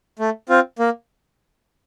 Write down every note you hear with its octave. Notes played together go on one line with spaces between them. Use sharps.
A3
C4 F4
A#3